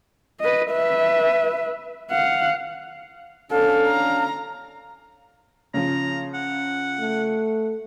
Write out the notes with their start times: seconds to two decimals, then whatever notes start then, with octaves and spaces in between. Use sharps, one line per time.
0.40 B4 D#5
0.71 B4 E5
2.11 F5 F#5
3.51 C#4 D4 A4 F5
3.87 A#5
5.74 C#3 F3 A#5
6.34 F#5
7.00 A3